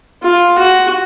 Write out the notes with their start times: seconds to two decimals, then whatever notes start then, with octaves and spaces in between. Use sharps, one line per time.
0.23 F4
0.58 F#4